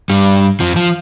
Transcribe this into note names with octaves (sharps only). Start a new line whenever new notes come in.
G2 G3
F2 F3
F3